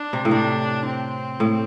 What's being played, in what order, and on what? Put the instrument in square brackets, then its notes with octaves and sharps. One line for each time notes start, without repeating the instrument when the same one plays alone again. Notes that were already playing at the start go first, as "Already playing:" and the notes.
Already playing: [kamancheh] D4
[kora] C3
A2
[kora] C3 [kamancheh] D4
[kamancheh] C4
[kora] A2